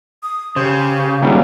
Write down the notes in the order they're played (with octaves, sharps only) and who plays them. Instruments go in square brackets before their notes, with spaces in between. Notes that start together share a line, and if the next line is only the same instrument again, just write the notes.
[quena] D#6
[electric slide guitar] C#3 [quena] G4 [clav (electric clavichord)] C5
[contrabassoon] D#1 [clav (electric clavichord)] C#3 F#3 G3